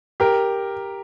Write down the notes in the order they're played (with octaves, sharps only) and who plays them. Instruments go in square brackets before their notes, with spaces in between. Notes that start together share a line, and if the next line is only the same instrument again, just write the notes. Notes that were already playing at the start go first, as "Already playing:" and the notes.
[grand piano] G4 A#4